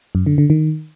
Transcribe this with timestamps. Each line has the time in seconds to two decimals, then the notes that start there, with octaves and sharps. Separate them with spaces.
0.15 F#2
0.26 D3
0.38 D3
0.50 D#3